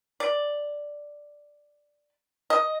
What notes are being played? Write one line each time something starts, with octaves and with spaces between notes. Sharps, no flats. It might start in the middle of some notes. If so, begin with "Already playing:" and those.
D5
D#5